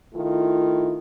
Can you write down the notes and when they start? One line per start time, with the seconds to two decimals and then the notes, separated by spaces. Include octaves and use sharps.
0.14 D#3 A3 E4 F4